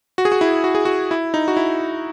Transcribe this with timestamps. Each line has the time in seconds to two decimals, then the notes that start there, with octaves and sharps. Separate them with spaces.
0.18 F#4
0.25 G#4
0.32 F#4
0.41 E4
0.64 F#4
0.75 G#4
0.85 F#4
1.11 E4
1.34 D#4
1.48 F#4
1.57 E4